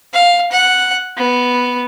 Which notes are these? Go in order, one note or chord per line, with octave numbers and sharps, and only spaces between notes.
F5
F#5
B3